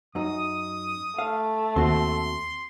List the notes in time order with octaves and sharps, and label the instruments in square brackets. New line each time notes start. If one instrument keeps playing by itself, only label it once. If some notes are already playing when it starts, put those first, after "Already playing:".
[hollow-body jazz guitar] F#2 D#4 [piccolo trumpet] D#6
[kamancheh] A3 [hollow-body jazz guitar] F5
[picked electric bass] D#2 [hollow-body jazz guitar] C4 F#4 [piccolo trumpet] C6